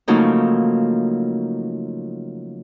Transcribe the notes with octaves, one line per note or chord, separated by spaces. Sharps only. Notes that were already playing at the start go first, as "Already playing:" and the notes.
C#3 F3 F#3 A3 A#3 D#4